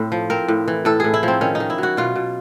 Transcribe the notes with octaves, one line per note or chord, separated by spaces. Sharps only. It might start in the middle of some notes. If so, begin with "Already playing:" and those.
Already playing: A2 C4
F3
C4 A#4
A2
E3
A2 A4
A2 G#4
E4
F3 C4
D#3 C#4
D#4
D#3
E4
F#3 F#4
B2 F4
B2